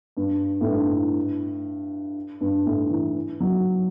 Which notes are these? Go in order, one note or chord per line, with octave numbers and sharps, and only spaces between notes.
G2
A2
G2
G2
A2
E3
F#3